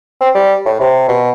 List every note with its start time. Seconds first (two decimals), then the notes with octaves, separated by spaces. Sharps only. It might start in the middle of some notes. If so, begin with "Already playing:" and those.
0.21 C4
0.35 G3
0.66 A2
0.80 C3
1.09 B2